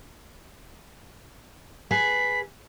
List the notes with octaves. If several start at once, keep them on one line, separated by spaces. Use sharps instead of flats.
G#4 B4 B6